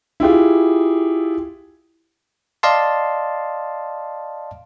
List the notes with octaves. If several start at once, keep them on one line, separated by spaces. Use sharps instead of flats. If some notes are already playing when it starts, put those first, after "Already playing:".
E4 F4 G4 G#4
D5 D#5 F5 A5 C6